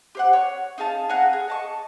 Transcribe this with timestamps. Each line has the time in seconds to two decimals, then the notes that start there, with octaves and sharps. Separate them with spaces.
0.15 G4 C5 F#5
0.33 C#5 F#6
0.78 D#4 G#4 F5 A5
1.09 G#4 F5 F#5 A#5
1.33 G#4
1.48 D#5 A5 C#6